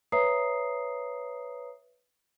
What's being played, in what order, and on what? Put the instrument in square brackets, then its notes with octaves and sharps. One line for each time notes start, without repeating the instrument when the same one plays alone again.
[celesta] B4 C#5 E5 A#5 D#6 C7